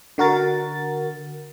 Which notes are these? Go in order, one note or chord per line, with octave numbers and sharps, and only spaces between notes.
D3 F#4 A#4 A6